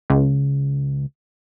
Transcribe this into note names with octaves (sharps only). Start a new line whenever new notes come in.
C#2